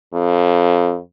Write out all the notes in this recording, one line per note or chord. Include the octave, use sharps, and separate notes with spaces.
F2